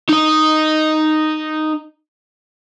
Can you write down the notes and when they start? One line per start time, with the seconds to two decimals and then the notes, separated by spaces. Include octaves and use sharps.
0.09 D#4 D#5